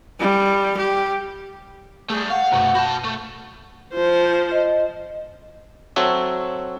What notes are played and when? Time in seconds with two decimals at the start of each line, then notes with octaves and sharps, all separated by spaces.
0.20 G3
0.77 G4
2.10 G3 A3 G#4
2.30 F5 F#5 C#6
2.52 C2 F#2 B2 A3
2.75 F#4 A5 B5 G6
3.05 A3
3.94 F3 C5
4.52 D#5
5.96 F#3 C4 F#4 A4 C#5 E5